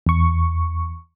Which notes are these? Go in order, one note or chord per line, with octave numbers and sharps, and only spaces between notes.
E2 C#6